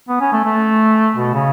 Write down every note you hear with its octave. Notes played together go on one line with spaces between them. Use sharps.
B3
C#4
A3
A3
B2
C#3